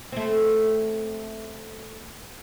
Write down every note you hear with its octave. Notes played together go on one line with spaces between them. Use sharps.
A3 C4